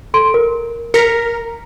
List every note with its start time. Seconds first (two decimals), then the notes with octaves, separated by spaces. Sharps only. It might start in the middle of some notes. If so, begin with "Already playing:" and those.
0.14 A4 C6 D7
0.34 A#4
0.94 A#4 A#6 B6 C#7